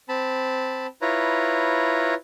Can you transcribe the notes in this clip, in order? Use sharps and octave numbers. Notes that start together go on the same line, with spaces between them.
C4 A5 B5
E4 F4 B4 C#5 A#5